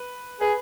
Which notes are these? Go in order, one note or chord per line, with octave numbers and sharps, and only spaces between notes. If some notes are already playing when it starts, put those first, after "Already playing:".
Already playing: B4
G#4 B4